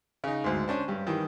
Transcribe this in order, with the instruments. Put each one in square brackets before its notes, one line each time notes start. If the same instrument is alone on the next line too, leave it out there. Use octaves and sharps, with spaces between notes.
[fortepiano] C#3 D#4
D2 G#2
C#4 D4 C5
G2 G4
D#3 E3 G3